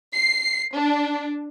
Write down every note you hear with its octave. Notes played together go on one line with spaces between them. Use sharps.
C7
D4